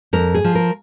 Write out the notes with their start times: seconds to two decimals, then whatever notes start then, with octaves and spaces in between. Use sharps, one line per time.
0.13 F2 A#4
0.34 G#4
0.44 F3
0.55 A#4